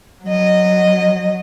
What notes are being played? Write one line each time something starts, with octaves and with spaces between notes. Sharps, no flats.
F#3 D#5